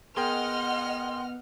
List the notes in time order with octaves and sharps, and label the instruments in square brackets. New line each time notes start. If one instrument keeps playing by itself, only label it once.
[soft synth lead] B3 [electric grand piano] G#4 A#4 G5 [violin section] D#5 F#5 F6 [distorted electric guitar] C6